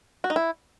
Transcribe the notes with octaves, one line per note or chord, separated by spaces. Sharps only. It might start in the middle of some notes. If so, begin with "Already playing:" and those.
F#4
D#4
E4